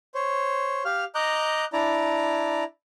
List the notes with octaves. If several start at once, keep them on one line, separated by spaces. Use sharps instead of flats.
C5 C#5
G4 F5 F6
D#5 A#5 D6 F#6 G6
D4 E4 D5 A#5